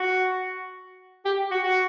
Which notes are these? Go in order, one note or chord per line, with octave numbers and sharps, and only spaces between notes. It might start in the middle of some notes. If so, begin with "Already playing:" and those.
Already playing: F#4
G4
F#4
F#4